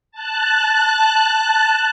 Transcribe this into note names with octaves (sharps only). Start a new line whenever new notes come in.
A5 F#6